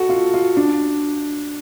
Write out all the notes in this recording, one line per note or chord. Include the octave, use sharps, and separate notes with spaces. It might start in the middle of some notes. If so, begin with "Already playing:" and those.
Already playing: F#4 A4
F4
F4
D4